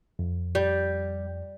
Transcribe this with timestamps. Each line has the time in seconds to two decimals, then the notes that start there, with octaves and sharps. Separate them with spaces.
0.19 F2
0.55 G3